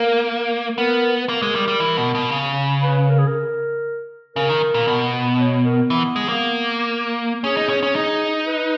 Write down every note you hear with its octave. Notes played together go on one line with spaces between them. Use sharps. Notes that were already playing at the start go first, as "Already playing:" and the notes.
Already playing: A#3 A#4
B3 A#4
A#3 A#4
G#3
G3
G3
E3
B2
B2
C#3
B4
A#4
G#4
A#4
C#3 A#4
D#3
A#2
B2
C#5
A#4
E3 B3
G#3
A#3
C#4 G#4
D#4
C#4
C#4
D#4 G#4
B4